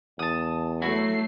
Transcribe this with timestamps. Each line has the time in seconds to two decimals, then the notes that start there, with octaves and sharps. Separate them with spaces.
0.19 E2 A5 D#6
0.82 F#3 A3 E4 F#4 C7